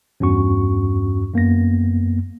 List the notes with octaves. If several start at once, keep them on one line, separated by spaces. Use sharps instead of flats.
E2 G2 C#4 F#4 C#6
F#2 A#3 B3 A#6